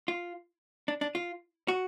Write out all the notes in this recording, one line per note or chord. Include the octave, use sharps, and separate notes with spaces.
F4
D4
D4
F4
F#4